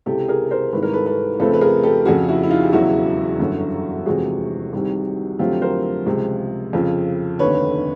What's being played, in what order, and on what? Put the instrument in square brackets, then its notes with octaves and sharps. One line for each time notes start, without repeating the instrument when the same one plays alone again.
[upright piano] C#2 C3 E3 G4 A4
G#4 A#4
A#4 C5
G#1 G#2 E3 G3 B4
A#4
A4 B4
A4 B4
F2 C#3 F3 A3 C4 A4 B4
B4
G#4 A#4
G4 A4
F2 C#3 F3 F#4 G#4
E4 F#4
E4
D#4 F4
G4
E1 E2 C#3 F#3 E4 F#4
G1 F#2 D3 F#3
F1 E2 C3 F3 G#3 F#4 G#4
C2 C3 D#3 G3
F2 D3 F#3 A3 C4 F4 G4
A#4 C5
C#2 C3 F3 G#3
F2 C#3 F3
F1 D#2 D3 B4 C#5